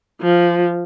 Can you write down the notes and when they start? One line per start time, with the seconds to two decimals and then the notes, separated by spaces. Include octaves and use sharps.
0.22 F3